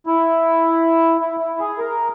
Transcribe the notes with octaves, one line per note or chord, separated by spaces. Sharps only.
E4
E4
E4
G#4
A#4